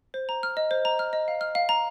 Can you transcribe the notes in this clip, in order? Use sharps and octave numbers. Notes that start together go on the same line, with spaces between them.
C5
A#5
F6
D#5
C5
A#5
F6
D#5
F5
F6
F5
A#5